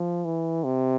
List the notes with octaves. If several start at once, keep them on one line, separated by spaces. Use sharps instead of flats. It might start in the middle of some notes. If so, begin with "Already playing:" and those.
Already playing: F3
E3
C3